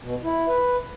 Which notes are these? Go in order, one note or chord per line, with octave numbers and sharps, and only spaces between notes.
B2
E4
B4